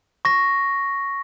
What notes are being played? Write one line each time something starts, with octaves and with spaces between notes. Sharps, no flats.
C#6 A#6